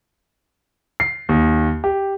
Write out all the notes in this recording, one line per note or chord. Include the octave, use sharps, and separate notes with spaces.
C7
D#2
G4